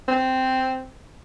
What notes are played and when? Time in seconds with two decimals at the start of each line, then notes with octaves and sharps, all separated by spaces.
0.08 C4